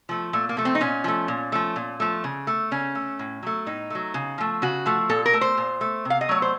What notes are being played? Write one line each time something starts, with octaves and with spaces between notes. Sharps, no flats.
F3 A3
A#2 A3
A#3
F3 A3
C4
D#4
A#2 C#4
F3 A3
A#2
F3 A3
A#2
F3 A3
C#3
A3
C#3 C#4
A3
A2
F#3 A3
A2 D#4
F#3 A3
C#3
F3 A3
C#3 F#4
F3 A3
A#2 A4
A#4
A3
C5
A#2
A3
C3
F5
D#5
F#3 A3 C#5
C5